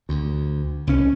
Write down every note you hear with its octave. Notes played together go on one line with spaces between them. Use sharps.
D2
C2 C#4